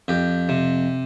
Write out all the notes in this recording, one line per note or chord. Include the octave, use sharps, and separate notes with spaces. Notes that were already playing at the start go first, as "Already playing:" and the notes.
F2 G4
C3